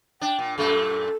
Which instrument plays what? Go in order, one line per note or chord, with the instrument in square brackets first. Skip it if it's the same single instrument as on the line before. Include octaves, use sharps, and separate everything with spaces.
[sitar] D4 [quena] G5
[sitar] A#2
[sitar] F#2 A#2 A3 [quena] A4